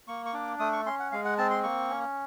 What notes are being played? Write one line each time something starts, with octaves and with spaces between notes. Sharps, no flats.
A#3 C#6
C#6
D4 D6
A3 D#6
C#6
C#4 C6
F#5
G#3 F5
F#5
C4 A5
C6
A#3 C#6
C#4